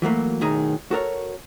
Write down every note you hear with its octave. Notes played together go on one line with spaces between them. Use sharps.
E3 F#3 A3 A#3
B1 A2 D#3 G#4 G#5 A#5
F#4 A4 A#4 C#5